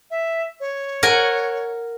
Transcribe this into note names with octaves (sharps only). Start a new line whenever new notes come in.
E5
C#5
A#4 F#5 G#5